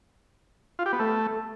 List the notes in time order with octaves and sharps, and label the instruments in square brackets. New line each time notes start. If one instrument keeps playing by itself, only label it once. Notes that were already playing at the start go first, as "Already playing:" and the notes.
[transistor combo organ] F4
G4
B3
A3